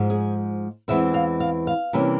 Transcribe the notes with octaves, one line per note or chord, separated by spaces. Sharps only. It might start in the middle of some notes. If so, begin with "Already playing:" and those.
Already playing: G#2 F3 G#3
G#4
E2 C3 E3 G#3 C4 E5
F5
F5
F5
C3 E3 G3 A#3 C#4